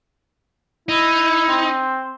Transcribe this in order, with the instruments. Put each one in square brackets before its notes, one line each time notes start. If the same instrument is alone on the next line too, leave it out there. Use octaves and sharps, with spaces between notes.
[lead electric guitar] D#4 [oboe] E4
[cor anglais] C4